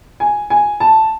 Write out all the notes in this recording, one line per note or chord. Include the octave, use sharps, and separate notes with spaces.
G#5
G#5
A5